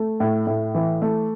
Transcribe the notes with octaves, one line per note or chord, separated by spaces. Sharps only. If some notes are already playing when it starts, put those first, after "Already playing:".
Already playing: A3
A2
A2
E3
A3